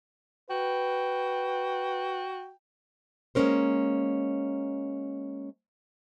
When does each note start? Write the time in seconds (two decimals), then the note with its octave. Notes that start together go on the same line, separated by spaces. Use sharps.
0.50 F#4 B4 G5
3.35 G#3 A#3 C4 C#4 A#4 C5